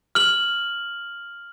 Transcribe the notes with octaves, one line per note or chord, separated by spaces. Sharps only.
F6 F#7